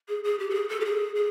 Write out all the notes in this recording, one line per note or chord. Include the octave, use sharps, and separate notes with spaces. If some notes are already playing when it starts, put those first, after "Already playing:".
G#4
G#4
G4
A4
G#4
A4
G4
G#4
G#4